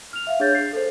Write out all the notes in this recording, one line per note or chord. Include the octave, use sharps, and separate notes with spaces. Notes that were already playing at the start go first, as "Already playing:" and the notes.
F6 F7
E5 F5
D4 G#4 C#5 G6 A6
A6 C7
A4 C5